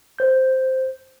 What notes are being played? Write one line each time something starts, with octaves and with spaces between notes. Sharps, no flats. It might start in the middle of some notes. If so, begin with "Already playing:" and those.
C5 G6